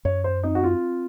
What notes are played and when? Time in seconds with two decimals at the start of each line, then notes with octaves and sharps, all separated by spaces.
0.05 F#2 C#5
0.24 C5
0.43 C4 D#4
0.55 F#4
0.64 F4